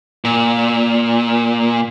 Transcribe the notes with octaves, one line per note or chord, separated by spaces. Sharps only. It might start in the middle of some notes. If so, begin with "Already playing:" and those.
A#2